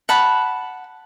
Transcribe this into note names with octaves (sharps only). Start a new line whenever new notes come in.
F#5 A5 B5